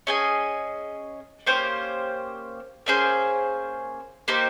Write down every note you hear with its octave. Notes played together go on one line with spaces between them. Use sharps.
C#4 G#4 D#5 G#5
A#3 C#4 G4 C5
A#3 C#4 G#4 C5
A#3 D#4 G4 C5